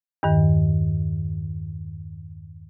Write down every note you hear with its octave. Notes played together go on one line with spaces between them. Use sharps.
E2 G2 D#3